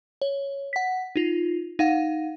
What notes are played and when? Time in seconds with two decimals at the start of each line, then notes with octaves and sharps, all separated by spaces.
0.22 C#5
0.73 F#5 B6
1.16 D#4 F4
1.79 D#4 F5 F#5